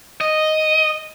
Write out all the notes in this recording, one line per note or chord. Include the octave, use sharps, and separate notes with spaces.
D#5